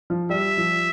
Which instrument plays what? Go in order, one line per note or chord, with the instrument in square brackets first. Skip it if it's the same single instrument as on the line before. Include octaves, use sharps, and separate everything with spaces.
[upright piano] F3
[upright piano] G3 [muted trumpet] E5
[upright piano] F3